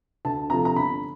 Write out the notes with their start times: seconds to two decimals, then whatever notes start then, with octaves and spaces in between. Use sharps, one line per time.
0.25 D2 A5
0.50 C3 F3 A3 A#5
0.65 A#5
0.76 G1 B5